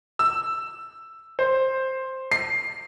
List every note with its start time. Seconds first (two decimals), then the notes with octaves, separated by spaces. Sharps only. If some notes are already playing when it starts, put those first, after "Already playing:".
0.19 E6
1.39 C5
2.31 C7